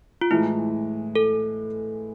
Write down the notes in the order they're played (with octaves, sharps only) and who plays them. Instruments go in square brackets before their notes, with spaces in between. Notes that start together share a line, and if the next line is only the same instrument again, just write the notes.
[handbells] F4
[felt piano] A2 E3 G#3 [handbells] E4
[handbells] A4